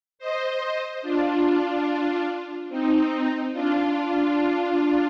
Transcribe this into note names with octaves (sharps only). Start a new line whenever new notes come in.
C5 D#5
D4 F4
C4 D#4
D4 F4